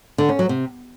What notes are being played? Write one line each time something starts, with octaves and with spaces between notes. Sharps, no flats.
D3
C#4
F#3
C3